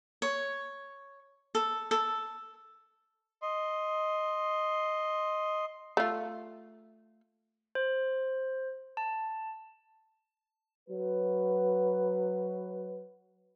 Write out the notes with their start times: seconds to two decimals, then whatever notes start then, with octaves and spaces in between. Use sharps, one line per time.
0.22 C#5
1.55 A4
1.91 A4
3.42 D#5 C6
5.97 A3 F4
7.75 C5
8.97 A5
10.89 F#3 B4